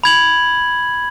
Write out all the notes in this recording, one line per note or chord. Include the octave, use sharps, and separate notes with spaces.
B5 G#6 F#7